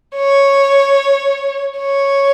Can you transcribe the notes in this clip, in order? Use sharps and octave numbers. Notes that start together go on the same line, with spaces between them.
C#5
C#5